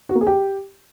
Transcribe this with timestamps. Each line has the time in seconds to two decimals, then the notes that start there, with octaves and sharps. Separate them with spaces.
0.09 F#4
0.15 A#3
0.21 G#4
0.27 G4